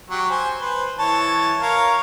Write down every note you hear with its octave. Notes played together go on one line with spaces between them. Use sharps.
F#3 G4 C#5
C5 G#5
B4 C5
E3 C#5 A5
A#4 C#5 F5